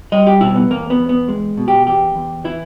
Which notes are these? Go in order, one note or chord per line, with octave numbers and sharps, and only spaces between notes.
G3 D#5
G4
B2 E4
B3
E2 A#3
B3
E2
B3
G#3
B2
G4
E2 G4
E2
E3 E4